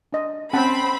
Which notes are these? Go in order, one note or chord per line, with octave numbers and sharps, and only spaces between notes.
D4 D#5
C4 C#4 F#5 A5 B5